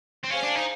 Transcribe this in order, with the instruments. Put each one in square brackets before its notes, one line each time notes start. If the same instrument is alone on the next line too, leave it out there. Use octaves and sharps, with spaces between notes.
[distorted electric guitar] C4
[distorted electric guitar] C#4 [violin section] G#4 C5 F5 G#5
[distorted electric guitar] D4
D#4